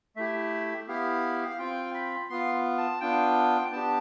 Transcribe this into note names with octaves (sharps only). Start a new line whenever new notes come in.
A3 E4 G4 E5
B3 E4 G4 F5
F5
C4 F4 G5
B5
B3 F4 C6
A5
B3 D4 F4 G5
B3 D4 G4 A5